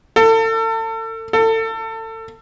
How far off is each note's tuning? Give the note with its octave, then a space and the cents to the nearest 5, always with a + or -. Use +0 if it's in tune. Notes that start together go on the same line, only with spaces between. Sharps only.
A4 +35
A4 +30